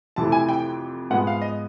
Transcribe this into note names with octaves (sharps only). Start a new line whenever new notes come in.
F2 C3 E3 A3 A5
G#5
G5
G#2 F3 G#3 B3 F#5
F5
D#5